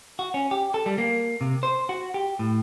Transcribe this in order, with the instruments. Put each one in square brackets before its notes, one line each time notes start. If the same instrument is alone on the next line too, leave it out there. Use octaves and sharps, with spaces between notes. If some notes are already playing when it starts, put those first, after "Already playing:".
[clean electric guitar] F#4
C#4
G4
A4
G3
A#3
C3
C5
F#4
G4
A2